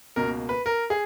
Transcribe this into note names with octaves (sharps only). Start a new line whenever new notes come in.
C#2 B2 A#3 A#4
B4
A#4
G#4